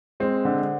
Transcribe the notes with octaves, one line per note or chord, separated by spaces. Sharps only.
G#3 C4
D3